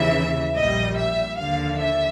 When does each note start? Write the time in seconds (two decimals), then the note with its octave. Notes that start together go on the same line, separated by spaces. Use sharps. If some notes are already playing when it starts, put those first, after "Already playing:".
Already playing: D#2 C#3 E3 E5
0.55 A#1 A#2 G3 D#5
0.97 E5
1.38 D#2 D3 F3 F5
1.80 E5